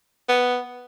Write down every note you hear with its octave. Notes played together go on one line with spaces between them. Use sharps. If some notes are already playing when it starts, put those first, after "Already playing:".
B3